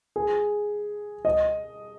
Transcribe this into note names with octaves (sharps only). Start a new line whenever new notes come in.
G#4
D#5